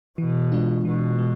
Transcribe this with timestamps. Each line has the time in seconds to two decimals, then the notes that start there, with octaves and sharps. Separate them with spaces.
0.18 B2 E3
0.52 G#3 D4 F4
0.85 B2 E3
1.19 G#3